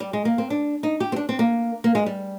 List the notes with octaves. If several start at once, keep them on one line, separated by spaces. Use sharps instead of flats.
G3
G#3
A#3
C4
D4
D#4
G4
C4
D4
C4
A#3
A#3
G#3
G3